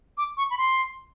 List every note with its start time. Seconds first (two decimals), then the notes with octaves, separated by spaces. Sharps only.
0.18 D6
0.37 C#6
0.51 B5
0.58 C6